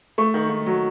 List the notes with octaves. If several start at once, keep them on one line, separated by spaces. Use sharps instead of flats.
A3 C#6
D#3
D#3
F#3